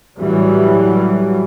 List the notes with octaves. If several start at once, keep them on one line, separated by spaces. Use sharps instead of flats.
A2 E3 F#3 G3